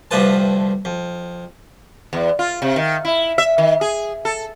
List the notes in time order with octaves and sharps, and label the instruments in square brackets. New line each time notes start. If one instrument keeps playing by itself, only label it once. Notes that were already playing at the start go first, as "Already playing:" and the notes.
[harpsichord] D2 G2 C3 F3 B4 A5
F2
[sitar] E2
F4
C3
D#3
E4
E5
D#3
G#4
A4